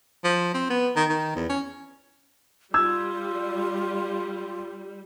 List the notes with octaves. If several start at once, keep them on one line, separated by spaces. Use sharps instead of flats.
F3
C4
B3
D#3
D#3
E2
C#4
G3 F4 E6 G#6